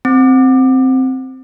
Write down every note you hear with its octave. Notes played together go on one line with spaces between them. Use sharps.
C4